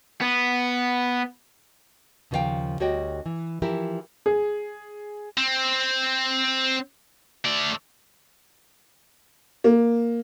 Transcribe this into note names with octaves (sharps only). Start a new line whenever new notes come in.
B3
D#2 C#3 F3 D#4 F5 G5
D2 G3 F#4 C#5 D#5 G5
E3
E3 F3 E4 G4 A#4
G#4
C4
A3 D5
A#3